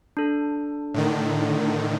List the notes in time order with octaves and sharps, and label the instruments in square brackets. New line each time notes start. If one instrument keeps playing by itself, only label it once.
[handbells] D4 A4
[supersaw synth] A2 D3 D#3